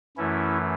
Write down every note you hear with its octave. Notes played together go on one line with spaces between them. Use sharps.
F#2 E3 A3 C#4 E4